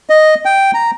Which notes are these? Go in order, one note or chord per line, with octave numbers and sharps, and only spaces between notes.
D#5
G5
A#5